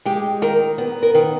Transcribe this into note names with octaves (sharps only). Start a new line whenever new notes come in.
G#3 G4
D#3 A#4
B3
A#4
D#3